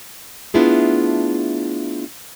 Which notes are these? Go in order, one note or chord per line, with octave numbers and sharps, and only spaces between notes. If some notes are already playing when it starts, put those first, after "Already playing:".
A3 B3 D4 E4 F4 G#4